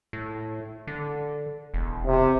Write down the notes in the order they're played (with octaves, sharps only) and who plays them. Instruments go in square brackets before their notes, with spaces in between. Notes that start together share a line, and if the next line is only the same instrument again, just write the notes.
[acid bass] A2
D3
E1
[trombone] C3